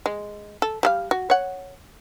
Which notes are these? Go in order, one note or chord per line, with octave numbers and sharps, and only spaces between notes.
G#3
A4
G3 A4 F5
F#4
C#5 F#5